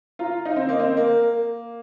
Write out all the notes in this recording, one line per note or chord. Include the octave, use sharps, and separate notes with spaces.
F4 A#5
D#4 F5
C4 C5
A#3 D#5
C4 D#5
A#3 A#4